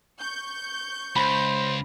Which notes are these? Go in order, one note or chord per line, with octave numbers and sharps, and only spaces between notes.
C#6 G6
C#2 C5 B5